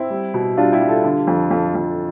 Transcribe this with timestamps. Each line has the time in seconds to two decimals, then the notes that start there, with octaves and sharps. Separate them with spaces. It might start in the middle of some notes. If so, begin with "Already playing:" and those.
Already playing: C4 E4
0.10 G3
0.34 B2
0.57 G3 D4 F4
0.72 E4 G4
0.81 G3
0.89 F4 A4
1.04 D3
1.27 F2
1.51 F2
1.75 F2